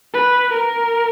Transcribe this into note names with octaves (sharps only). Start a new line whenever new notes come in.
B4
A#4